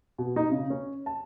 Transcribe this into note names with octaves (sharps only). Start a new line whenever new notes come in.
B2
D#4
C#3
C#4
A5